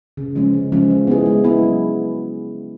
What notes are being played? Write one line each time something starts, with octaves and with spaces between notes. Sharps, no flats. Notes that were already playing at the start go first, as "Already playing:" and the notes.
C#3
F3 G#3 C#4
C#3
F3 G#3 C#4
G#3
B3 E4 G#4
G#3
B3 E4 G#4
F#3